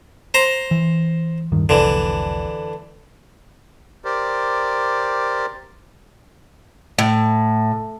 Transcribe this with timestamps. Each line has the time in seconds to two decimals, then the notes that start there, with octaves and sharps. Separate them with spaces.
0.34 C5 A#5
0.71 E3
1.52 D1 G2 D#3
1.69 F1 C2 D3 E3
4.05 G4 A#4 C5 D5
6.99 A2